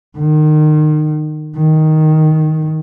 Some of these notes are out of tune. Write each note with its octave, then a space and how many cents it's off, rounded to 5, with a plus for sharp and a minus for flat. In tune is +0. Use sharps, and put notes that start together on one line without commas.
D#3 -30
D#3 +5